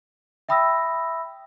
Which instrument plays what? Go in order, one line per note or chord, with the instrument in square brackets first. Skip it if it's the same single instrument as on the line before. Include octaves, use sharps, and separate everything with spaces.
[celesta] E5 G5 B5 D#6 E6 A#6